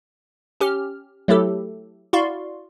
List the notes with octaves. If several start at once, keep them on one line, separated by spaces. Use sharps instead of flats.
C#4 G4 F6
F#3 A3 E4 G4 A4
E4 F#4 D5 F5 C6 C#6